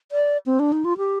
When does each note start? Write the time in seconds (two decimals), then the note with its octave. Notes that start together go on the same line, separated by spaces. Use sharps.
0.12 D5
0.46 C4
0.59 D4
0.72 D#4
0.85 F4
0.98 G4